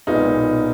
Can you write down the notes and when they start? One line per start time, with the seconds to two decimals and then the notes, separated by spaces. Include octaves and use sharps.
0.07 B1 A#2 G#3 B3 D#4